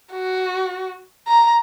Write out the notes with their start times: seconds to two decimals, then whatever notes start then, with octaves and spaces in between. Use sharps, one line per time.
0.12 F#4
1.28 A#5